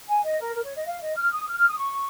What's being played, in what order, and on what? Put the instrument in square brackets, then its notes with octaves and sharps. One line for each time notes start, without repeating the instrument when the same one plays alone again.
[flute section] G#5
D#5
A#4
A#4
C#5
D#5
F5
D#5
F6
D#6
F6
F6
D#6
C#6